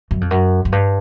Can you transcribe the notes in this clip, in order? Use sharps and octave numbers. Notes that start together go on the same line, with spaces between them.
F#2
F2
F#2
F#2
G2